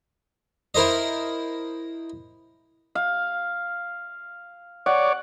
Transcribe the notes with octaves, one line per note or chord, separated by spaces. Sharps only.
E4 A#4 C5 D#5
F5
C#5 D5 F#5